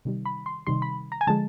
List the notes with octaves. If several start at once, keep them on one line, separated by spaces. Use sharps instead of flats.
C3 D#3 G3
B5
C6
C3 D#3 G3 C6
B5
A#5
G#5
D3 F3 G#3 A5